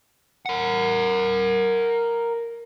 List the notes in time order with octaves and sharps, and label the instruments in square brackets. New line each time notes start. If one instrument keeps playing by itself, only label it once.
[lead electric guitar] A#4 F#5